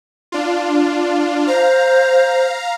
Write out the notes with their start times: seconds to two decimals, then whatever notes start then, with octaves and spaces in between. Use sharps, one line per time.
0.32 D4 F4
1.47 C5 F5 A#5